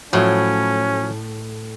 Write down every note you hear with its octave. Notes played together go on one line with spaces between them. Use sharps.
A2 F3 F#3 C#4 E5